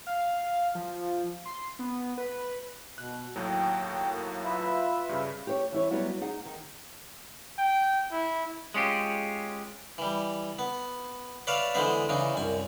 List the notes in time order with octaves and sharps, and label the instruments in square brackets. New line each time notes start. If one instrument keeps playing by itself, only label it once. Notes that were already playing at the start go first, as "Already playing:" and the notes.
[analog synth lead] F5
F3
C6
B3
B4
[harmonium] B2 [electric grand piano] F#6
[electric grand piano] D#2 A2 F#3 [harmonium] G5
[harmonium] A#3
F4 B4 E5
[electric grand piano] G2 C#3
[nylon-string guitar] G4 C5 C#5
E3 E4 C#5
F#3 G3 B3 E4 F#4
D#4 G#4 F#5
D#3
[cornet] G5
E4
[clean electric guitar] G#3 C#4 F4 G4
[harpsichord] E3 G3
B3
B4 C#5 D5 E5 F5 A5
D3 E3 G#3 B3 C5 E5
C#3 E3 D4 D#4
C2 F#2 G#5